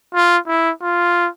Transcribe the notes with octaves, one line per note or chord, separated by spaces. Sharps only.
F4
E4
F4